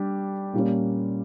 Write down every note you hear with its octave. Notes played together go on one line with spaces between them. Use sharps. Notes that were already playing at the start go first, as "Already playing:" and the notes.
Already playing: G3 D4 G4
A#2 G3 A#3 C#4